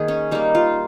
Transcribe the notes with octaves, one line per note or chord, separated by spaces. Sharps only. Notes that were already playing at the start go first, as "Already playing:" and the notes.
Already playing: D#3 A#3 G#4
C#4
G3 A#3 D#4
F4